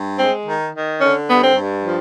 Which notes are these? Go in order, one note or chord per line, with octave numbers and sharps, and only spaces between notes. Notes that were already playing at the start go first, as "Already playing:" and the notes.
Already playing: G2
G#3 C4
D#3
D#3
D3 C#4
G2 B3
C4
G2
F3